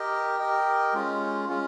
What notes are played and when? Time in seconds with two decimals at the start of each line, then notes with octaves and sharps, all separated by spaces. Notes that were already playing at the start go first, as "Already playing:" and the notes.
Already playing: G4 A#4 D#5 G5
0.39 G4 A#4 D#5 G5
0.93 G#3 C#4 F4
1.49 G#3 C#4 F4